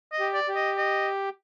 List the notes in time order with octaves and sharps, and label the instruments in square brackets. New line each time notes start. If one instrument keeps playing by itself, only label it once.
[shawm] D#5
[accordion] G4
[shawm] D5
[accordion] G4
[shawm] D#5
D#5